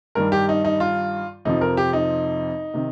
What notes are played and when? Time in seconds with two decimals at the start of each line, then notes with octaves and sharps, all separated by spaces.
0.15 G2 D#3 G3 A#4
0.32 G4
0.49 D#4
0.65 D#4
0.80 F4
1.45 F2 C3 F3 D#4
1.61 A#4
1.77 G4
1.93 D#4
2.74 C3 D#3